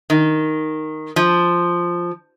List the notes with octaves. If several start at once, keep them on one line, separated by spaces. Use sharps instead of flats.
D#3
F3